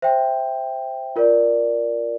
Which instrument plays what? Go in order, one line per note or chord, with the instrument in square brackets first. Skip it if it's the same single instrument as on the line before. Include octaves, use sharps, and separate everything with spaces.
[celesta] C5 E5 G5
F4 A#4 D5